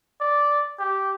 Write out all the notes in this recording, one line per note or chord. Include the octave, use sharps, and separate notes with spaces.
D5
G4